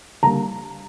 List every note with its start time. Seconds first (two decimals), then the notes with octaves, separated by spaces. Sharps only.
0.23 D3 G3 A#3 A#5